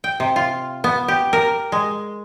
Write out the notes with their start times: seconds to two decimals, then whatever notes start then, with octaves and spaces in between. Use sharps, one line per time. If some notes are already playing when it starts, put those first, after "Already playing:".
0.04 G5
0.20 C3
0.36 F4
0.84 B3
1.08 G4
1.33 A#4
1.72 G#3